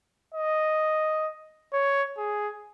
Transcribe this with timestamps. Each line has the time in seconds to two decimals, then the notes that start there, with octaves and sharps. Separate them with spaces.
0.34 D#5
1.73 C#5
2.18 G#4